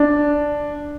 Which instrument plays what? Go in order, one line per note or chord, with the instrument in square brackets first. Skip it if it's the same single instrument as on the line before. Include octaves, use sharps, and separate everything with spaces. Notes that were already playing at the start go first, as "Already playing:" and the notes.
Already playing: [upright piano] D4